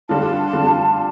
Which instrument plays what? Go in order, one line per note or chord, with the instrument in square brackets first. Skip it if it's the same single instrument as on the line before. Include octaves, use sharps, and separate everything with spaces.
[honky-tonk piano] D3 G3 D4 F4 [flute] A5
[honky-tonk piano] D3 G3 D4 F4